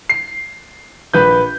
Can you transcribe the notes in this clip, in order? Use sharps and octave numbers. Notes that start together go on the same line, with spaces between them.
C7
A#1 B4 G6